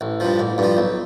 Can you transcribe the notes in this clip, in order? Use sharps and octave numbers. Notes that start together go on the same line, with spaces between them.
A1
G2 F3
A1
G2 F3
B1